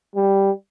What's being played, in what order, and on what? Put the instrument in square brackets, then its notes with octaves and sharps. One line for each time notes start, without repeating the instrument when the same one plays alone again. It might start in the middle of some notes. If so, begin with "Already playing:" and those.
[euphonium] G3